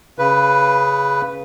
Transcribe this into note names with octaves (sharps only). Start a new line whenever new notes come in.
C#3 B4